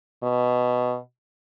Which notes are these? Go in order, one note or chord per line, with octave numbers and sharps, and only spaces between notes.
B2